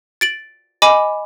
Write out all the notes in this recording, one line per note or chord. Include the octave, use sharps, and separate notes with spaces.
A6 D7 F#7
D#5 G#5 B5 D6